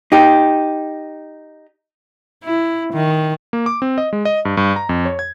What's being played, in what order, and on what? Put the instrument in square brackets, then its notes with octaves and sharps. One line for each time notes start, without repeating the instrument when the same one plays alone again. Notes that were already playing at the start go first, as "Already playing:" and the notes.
[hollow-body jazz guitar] D#4 G4
[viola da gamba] E4
D#3
[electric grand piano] A#3
D6
C4
D#5
G#3
D#5
G2
G2
A#5
F2
C#5
G#6